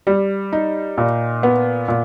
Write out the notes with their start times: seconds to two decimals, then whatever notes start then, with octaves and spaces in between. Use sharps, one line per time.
0.07 G3
0.53 D#4
0.98 A#2
1.43 B3
1.88 A#2